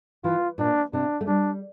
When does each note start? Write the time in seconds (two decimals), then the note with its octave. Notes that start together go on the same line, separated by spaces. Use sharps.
0.24 E3 F4
0.58 A#2 D4
0.93 C3 D4
1.21 A3
1.27 G3 D4